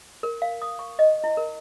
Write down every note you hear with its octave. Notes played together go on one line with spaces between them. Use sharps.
A#4
F5
D#6
C#6
D#5
E4
A#4